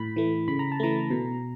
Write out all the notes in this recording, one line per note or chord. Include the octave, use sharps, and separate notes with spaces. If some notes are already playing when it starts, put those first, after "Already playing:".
Already playing: A2 B5
E3 A3
C#3 B5
A#5
A5
E3 A3 A#5
B2